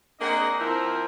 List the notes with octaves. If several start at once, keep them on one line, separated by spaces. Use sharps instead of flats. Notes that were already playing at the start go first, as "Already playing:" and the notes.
A#3 C4 D4 G#4 D#5 F#5
F3 C4 E4 A#4